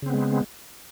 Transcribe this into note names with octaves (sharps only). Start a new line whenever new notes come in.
C#3 G#3 B3 C4